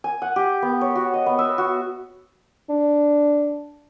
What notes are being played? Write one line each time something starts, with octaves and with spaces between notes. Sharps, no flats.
G#5
F#5
G4
B3
C#5
F#4
D#5
B3
E5
F#4
D4